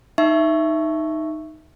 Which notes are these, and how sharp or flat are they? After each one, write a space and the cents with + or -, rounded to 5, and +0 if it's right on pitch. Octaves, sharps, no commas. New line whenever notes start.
D#4 +0 E5 +10 C#6 +0